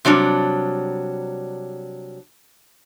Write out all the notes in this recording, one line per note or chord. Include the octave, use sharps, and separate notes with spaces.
C3 F#3 G3 D4